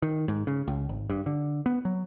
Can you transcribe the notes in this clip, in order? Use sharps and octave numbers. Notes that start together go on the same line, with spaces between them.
D#3
G#2
C#3
C#2
G#1
G2
D3
B3
F#3